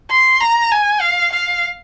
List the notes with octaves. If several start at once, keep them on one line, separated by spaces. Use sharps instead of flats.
C6
A#5
G#5
F5
F5